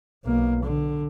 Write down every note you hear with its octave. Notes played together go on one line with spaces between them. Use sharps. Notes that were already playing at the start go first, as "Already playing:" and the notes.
B1 A#3
D3